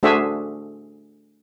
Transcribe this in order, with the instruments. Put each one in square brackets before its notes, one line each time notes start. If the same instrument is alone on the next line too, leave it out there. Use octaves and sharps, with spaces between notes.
[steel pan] A3 D4 F#4 G#4 C5 E5